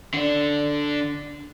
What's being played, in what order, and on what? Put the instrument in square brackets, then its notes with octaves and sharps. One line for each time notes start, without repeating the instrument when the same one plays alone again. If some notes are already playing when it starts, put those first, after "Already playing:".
[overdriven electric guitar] D3 D4